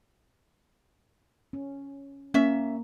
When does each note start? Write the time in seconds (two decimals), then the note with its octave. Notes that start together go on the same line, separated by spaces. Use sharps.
1.53 C#4
2.34 A#3 C#4 E5